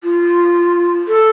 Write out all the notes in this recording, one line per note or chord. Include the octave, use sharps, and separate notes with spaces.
F4
A4